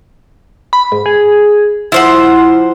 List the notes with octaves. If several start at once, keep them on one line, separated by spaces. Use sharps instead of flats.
B5
G#2
G#4
F3 E4 C5 F#5